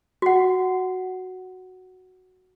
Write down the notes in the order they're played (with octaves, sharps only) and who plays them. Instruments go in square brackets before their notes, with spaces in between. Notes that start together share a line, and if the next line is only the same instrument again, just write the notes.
[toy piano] F#4 F#5